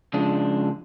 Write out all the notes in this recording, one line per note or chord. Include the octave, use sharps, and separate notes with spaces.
C#3 F3 G#3 D4